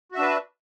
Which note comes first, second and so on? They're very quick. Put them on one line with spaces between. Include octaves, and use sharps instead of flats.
F#4 E5 D4 B4